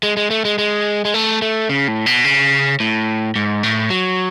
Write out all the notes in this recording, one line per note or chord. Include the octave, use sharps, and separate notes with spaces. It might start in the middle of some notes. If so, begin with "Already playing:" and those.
G#3
G#3
A3
G#3
G#3
G#3
A3
A3
C#3
A2
B2
C#3
A2
G#2
A2
F#3